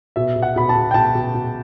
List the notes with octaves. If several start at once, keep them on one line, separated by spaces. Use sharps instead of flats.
B2 E5
B2
F#5
B2 B5
A5
B2
G5
B2 A5
B2
B2